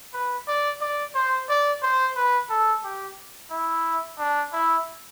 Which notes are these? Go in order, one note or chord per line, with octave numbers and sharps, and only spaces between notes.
B4
D5
D5
C5
D5
C5
B4
A4
G4
E4
D4
E4